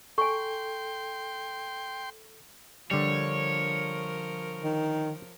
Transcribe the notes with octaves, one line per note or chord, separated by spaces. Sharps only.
A4 G5 G#5 C6 C#6
D3 F3 G3 A#4 C#5
D#3